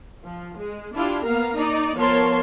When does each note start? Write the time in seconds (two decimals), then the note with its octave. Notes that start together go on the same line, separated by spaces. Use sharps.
0.23 F3
0.58 G#3
0.95 D4 E4 F4 G4
1.25 A#3 B3 A#4 F5 A#5
1.56 D#4 D5
1.96 F3 B3 A#4 C#5 A5 C6